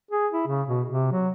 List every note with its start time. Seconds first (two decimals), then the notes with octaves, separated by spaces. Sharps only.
0.11 G#4
0.32 E4
0.47 C#3
0.68 B2
0.88 C3
1.12 F#3